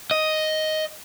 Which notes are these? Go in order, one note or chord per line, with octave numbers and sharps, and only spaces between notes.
D#5